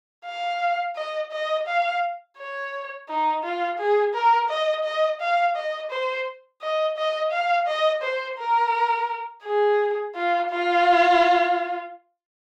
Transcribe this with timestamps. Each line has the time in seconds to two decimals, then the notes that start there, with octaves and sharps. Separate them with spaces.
0.26 F5
0.96 D#5
1.32 D#5
1.67 F5
2.37 C#5
3.09 D#4
3.44 F4
3.79 G#4
4.14 A#4
4.49 D#5
4.84 D#5
5.21 F5
5.56 D#5
5.91 C5
6.62 D#5
6.97 D#5
7.32 F5
7.67 D#5
8.02 C5
8.38 A#4
9.44 G#4
10.15 F4
10.50 F4